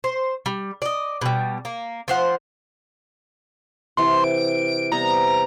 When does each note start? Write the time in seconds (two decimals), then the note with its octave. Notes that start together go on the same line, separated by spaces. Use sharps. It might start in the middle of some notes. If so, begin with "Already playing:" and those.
0.04 C5
0.46 G3
0.82 D5 D#5
1.21 B2 G3
1.65 A#3
2.08 F3 C5 F#5
3.97 C3 E3 F#5 C6
4.24 D7
4.92 C3 G3 B3 A#5